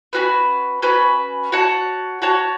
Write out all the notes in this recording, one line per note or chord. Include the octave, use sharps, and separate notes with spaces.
C#4 F#4 B4
C#4 F#4 B4
F#4 C#5 F#5 A5
F#4 C#5 F#5 A5